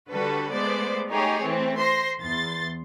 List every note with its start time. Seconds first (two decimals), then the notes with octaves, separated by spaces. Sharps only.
0.11 D3 G3 F#4 A4 B4
0.53 G#3 A3 B3 C5 D5
1.10 A3 D#4 G4 G#4 C#5
1.44 E3 A3 C4
1.78 C5 C6 A#6
2.20 E2 C6 A6